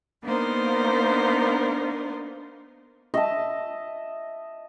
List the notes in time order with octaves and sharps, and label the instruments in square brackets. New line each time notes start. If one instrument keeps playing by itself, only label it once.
[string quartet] A#3 B3 D4 D#4 A#4 C5
[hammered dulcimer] D#5 E5 A5